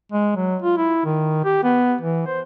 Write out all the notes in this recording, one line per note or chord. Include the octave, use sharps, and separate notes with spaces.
G#3
F#3
F4
E4
D#3
G4
B3
E3
C5